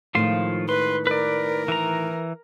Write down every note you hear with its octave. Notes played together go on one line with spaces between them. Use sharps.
A2 D#3 F3 G#3 F4 C6
B4 C6
A#4 B4 D5
E3 A#5